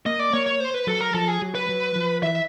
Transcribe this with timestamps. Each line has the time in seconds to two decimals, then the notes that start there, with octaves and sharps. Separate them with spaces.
0.06 A#3 D#5
0.19 D5
0.33 A#3 C#5
0.46 C#5
0.60 C5
0.74 B4
0.87 F#3 A4
1.01 A#4
1.14 F3 A4
1.28 G#4
1.42 F#3
1.55 B4
1.69 F#3
1.96 F3
2.23 E3 E5